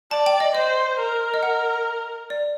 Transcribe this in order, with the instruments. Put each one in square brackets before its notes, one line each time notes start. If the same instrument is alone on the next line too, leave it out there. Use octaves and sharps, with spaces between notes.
[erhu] D5 [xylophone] A5
[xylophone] G5
D#5
[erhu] C5 [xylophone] D#5
[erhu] A#4
[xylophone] D#5
F#5
D5